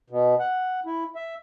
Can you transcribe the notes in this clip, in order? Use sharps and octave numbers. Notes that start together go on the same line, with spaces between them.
B2
F#5
E4
E5